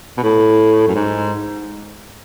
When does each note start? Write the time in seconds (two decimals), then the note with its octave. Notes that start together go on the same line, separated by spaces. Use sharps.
0.17 B2
0.23 A2
0.88 F#2
0.95 G#2